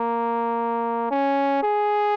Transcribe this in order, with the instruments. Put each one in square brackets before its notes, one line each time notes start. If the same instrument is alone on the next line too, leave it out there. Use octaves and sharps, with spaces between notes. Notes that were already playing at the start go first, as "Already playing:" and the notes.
Already playing: [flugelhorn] A#3
C#4
G#4